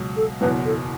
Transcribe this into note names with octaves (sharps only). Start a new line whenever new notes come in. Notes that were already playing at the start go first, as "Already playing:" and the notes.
Already playing: C#2 B2 F#3
A4
F#1 E2 B2 F#3 B4
A4